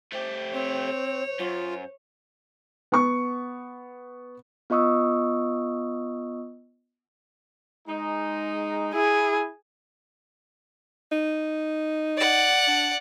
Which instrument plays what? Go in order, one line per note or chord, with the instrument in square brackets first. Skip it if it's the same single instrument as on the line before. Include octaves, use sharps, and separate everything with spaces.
[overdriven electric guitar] A3 G4 [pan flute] C5
[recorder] C4 [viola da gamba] C#5
[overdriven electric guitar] F#2 [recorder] F4
[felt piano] B3 C#6
[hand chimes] B3 F4 D#5 C#6 D#6 E6
[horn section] G#3 D#4
[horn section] E4 [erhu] G#4
[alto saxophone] D#4
[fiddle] D5 F#5
[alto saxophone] D4